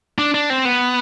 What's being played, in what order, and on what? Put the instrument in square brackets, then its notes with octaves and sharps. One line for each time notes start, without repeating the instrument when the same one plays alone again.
[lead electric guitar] D4
D4
C4
B3